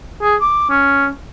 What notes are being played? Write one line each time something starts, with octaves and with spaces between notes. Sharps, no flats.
G#4
D6
C#4